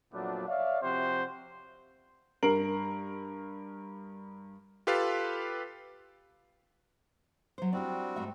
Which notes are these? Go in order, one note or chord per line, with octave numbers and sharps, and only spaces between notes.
F2 A#2 F#3 A3 B3 D4
C#5 D5 E5 F5
C3 F3 C4 F#4 G4 C5
G2 A#4 C7 D7 F#7
F4 G4 A4 B4 F5
F#3 C5
G3 C4 D4 E4 F#4 D5
G#2 A3 E5